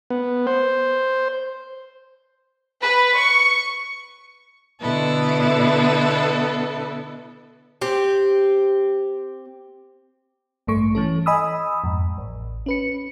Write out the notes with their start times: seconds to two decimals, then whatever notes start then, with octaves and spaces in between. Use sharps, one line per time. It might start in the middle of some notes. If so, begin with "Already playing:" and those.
0.10 B3
0.47 C5
2.82 B4
3.17 C#6
4.80 B2 D3 B3 E4 A4
7.81 C4 G4
10.67 A1 G2 A3 C#6
10.95 E3 C#4 A4
11.26 D#5 G#5 B5 D#6 E6
11.84 F2 G#2
12.18 A1
12.66 C#4 B4 C#7